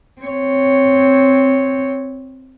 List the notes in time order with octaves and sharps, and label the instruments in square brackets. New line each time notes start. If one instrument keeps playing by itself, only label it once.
[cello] C4 C#5